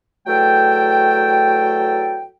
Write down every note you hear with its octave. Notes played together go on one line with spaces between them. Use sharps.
E2 F#3 A3 A4 G5